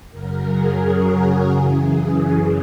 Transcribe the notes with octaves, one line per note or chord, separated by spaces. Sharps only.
F#2 C#3 F#3 A#4
G#4
F#4
F#4
F#2 C#3 E3 G#4